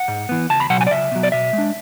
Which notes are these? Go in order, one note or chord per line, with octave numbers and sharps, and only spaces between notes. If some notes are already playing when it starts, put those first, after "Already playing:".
Already playing: F#5
G#2
E3 B3
C#2 A5
B5
B2 F#3 F#5
G#5
D5
C#2 E5
B2 F#3
D5
B2 E5
G#3
D4